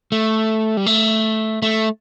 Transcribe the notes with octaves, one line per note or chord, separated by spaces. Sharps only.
A3
G3
A3
A3